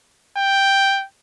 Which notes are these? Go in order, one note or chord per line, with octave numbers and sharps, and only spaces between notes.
G5